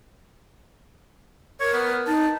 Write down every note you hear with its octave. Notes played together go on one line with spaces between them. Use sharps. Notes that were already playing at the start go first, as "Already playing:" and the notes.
A#4 C#5
B3
D#4 A5